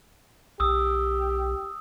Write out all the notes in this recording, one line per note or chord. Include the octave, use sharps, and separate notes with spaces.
B1 G4 D#6 E6